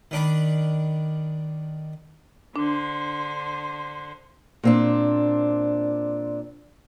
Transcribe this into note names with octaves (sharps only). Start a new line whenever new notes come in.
D#3 D4 B5
D3 D4 C5
A#2 C4 D4